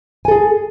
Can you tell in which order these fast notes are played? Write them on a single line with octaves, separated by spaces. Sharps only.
G#5 A4 G#4